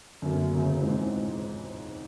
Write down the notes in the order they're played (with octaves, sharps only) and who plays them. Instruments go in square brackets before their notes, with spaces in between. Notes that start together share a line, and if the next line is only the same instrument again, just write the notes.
[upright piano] F#2 D3 F#3 A#3
E1 D2 C#3 F#3
A1 G#2 F3 G#3 C4